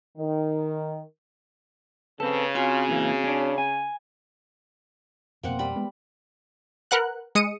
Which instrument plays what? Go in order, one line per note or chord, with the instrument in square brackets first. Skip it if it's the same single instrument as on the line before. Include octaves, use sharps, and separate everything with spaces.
[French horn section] D#3
[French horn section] C#3 [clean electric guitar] C4 A4 [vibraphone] B4
[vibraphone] C4 F#4 G#5 [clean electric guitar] F4
[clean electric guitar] A#2 E3 A#3
C#4 D4
G#5
[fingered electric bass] F2 B2 [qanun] A#3 C4 F#5
[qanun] G3 B5
[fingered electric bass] G#3 B3
[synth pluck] A#4 B4 F#5 F#6
G#3 D#6 C#7 D#7